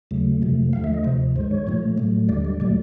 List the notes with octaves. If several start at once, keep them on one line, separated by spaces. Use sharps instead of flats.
D#2 C#3 F#3 A3
F2 C3 F3 A3
D#2 D3 F3 A3 F5
E5
D#5
D2 C3 F3 C5
G2 D#3 G#3 C5
C#5
A#2 F3 A3
A2 F#3 A3
D#2 D3 G3 D5
D5
A#2 F#3 A3 D5